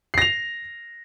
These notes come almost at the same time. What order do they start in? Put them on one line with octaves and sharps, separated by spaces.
C7 A#6 F7